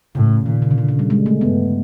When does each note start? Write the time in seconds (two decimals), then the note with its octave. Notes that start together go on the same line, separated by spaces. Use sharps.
0.15 A2 C#3
0.46 A#2 D#3
0.62 C#3
0.71 D3
0.78 C#3
0.89 C#3
0.99 G3
1.10 G#3
1.26 A3
1.41 G2 B3